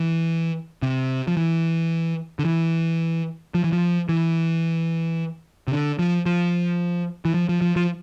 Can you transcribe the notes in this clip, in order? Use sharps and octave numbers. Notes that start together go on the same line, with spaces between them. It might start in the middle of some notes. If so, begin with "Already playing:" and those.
Already playing: E3
C3
F3
E3
D3
E3
F3
E3
F3
E3
C3
D3
F3
F3
E3
F3
F3
F3
F3